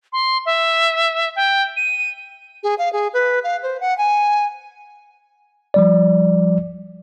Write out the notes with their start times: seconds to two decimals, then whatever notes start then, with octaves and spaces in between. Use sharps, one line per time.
0.13 C6
0.46 E5
1.36 G5
1.77 D#7
2.63 G#4
2.79 F5
2.93 G#4
3.14 B4
3.44 F5
3.63 C5
3.81 F#5
3.98 G#5
5.74 F3 G3 D5